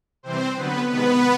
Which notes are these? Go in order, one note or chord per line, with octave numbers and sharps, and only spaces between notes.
C3 E3 G3 C4 C5
D3 F#3 B3 B4
C3 D#3 G#3 B3 B4